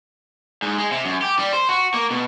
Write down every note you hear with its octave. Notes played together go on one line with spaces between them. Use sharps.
G#2
G#3
C3
F#2
G4
G3
C5
F#4
A#3
B2